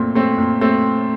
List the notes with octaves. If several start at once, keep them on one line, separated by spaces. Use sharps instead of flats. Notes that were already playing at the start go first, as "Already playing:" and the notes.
Already playing: A#2 A3 C4
A3 C4
A#2
A3 C4